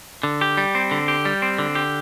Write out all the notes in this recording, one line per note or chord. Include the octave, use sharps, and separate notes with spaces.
D3
G4
G3
C4
D3
G4
G3
C4
D3
G4